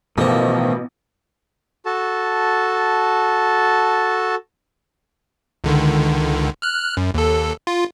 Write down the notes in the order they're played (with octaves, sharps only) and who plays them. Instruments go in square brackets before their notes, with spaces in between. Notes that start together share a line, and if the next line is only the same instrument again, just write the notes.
[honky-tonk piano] A1 [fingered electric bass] B2 [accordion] D#3 F3 [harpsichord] A3 A#3
[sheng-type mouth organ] F#4 A4 A5
[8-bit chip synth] C#2 D3 D#3
F6 F#6
F#2
D#2 A4
F4